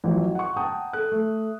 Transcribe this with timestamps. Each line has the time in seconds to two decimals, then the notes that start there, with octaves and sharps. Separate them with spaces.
0.04 A1 F3 F#3
0.35 F#5 C#6
0.56 F#5 G5 A5 A#5 D#6
0.93 A4 F#6
1.12 A3